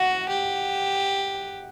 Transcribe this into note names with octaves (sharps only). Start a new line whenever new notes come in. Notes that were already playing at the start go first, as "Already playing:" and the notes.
Already playing: F#4 F#5
G4